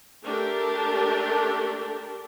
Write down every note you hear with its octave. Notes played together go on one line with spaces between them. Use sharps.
A3 D4 G4 A4 A#4